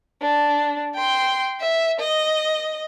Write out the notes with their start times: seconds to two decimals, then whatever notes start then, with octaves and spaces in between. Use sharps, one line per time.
0.22 D4
0.95 G5 C6
1.61 E5
2.00 D#5